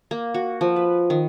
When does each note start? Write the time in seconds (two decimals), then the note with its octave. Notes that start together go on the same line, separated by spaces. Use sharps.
0.11 A#3
0.34 F#4
0.61 F3
0.76 B4
1.10 D#3